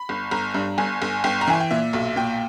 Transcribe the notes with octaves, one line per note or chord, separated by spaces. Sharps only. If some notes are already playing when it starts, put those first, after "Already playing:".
Already playing: B5
G1
G1 A#5
G2
G1 G#5
G1
G1 G5
A#5
E3 G#5
G5
A#2 E5
B1
A#2 G5